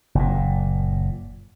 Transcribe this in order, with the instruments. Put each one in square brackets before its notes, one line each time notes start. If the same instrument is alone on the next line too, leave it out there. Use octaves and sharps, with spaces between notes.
[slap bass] F#1 A#2